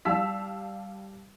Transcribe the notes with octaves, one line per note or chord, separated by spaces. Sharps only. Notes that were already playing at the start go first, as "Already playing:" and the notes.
G3 F5 A5 E6 B6